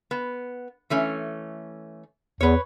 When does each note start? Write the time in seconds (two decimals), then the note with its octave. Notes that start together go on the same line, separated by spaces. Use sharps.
0.11 B3
0.90 E3 A3 C#4
2.41 E2 B4 C#5